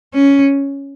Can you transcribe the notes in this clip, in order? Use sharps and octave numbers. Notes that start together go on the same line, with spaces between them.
C#4